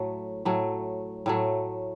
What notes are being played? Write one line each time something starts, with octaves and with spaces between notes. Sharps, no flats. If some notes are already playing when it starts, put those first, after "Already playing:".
Already playing: A2 F#3 A3
A2 F#3 A3
A2 F#3 A3